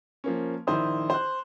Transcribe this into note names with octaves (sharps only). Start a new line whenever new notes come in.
F3 A#3 C#4
A#1 D#3 E4 C5 D#6
C5 F#6